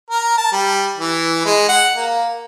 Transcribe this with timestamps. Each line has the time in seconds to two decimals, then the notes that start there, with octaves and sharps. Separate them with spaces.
0.11 A#4
0.38 A5
0.53 G3
0.98 E3
1.46 G#3
1.69 F#5
1.95 A#3